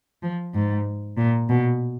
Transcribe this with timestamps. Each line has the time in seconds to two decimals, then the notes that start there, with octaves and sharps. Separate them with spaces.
0.22 F3
0.54 G#2
1.17 A#2
1.49 B2